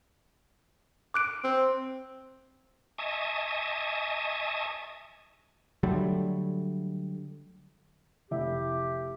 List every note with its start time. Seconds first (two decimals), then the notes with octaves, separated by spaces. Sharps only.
1.14 D6 F#6 D7
1.44 C4
2.98 D#5 E5 G#5 A5 C#6 D#6
5.83 D3 F#3 G3 A3
8.31 F1 E4 G4 E5